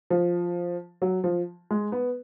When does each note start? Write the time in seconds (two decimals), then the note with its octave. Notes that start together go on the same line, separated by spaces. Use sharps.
0.10 F3
1.02 F#3
1.24 F3
1.71 G#3
1.92 B3